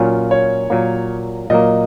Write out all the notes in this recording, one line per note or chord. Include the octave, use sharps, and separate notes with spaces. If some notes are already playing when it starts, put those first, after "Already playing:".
Already playing: A#2 F#3 C#4 F4
C#5
A#2 F#3 A#3
A#2 F#3 A#3 D#5